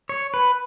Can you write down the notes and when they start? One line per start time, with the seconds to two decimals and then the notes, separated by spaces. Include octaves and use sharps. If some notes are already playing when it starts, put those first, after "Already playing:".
0.09 C#5
0.34 B4